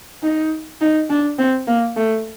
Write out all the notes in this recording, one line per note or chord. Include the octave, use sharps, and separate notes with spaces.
D#4
D#4
D4
C4
A#3
A3